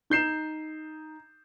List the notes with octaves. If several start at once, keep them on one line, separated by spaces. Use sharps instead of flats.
D#4 G6 C7 E7